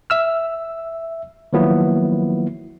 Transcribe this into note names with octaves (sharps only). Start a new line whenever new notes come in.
E5 E6 F6
D#3 F3 F#3 A#3 B3 E4